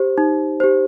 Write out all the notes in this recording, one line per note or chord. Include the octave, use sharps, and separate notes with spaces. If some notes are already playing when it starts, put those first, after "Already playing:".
Already playing: G4 C5
D#4
G4 C5